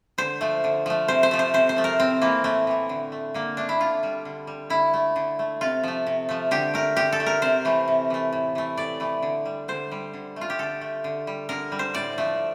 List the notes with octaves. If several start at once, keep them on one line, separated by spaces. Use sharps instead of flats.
D3 C5
F3 A3
D3
F3 A3
C3 C5
C5
F3 A3
C5
C3 C5
C5
F3 A3
A#4
A2 C4
E3 A3 A#3
A2 A3
E3 A3
D3
A3
D3 A#3
A3 D4
E4
D3 F4
G3
D3
G3
D3 E4
A3
D3
A3
C3 F4
F3 A3
C3
F3 A3
D3 G4
A3 A#4
D3 G4
A4
A3
A#4
C3 C5
E3 A3
C3
E3 A3
A2
E3 A3
A2 D5
E3 A3
D3
G3
D3 C5
G3
D3
A3 F4
G4
D3 A4
A3
D3
G3
D3 A#4
G3
C5
A2 D5
F3 A3